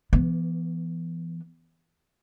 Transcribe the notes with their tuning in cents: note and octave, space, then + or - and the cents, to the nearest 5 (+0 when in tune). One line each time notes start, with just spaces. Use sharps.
E3 +30 B3 +0